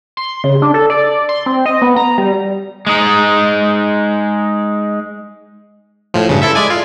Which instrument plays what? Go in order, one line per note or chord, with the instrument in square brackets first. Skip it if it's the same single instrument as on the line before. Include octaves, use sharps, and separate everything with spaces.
[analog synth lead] C6
C#3
D4
A4
D5
C6
C4
D#5
B3
A#5
G3
[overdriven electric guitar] G#3 D#4
[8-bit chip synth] A2 F3
G2 C#3
E4 A4 E5
G#3 D5 G#5
F4